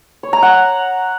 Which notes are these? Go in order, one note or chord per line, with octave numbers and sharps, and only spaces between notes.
C#5
A#5
F#5